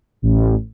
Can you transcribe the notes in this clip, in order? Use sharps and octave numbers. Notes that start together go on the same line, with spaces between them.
A1